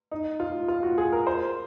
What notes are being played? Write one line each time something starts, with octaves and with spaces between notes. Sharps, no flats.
D#4
F4
F4
F#4
G#4
A#4
C5